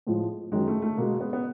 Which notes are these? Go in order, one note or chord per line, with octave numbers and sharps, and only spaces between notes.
A2 F3 G#3
F#2 D#3 F#3 G#3
A3
A3
B2 G#3 A#3
B3
B3